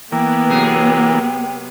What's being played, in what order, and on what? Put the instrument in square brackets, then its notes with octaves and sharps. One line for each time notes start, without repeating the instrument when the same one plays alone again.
[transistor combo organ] E3 A#3 [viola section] B3 [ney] G5
[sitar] C3 F#3 G#4